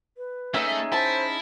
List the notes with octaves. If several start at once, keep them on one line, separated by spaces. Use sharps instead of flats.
B4
A3 C#4 D#4 G#4 E5
E4 C5 A5